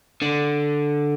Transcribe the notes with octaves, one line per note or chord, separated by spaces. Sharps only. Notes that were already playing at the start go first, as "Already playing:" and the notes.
D3